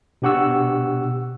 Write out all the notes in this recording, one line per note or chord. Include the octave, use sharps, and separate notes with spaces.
B2 D4 G4 F#5 C#6 E6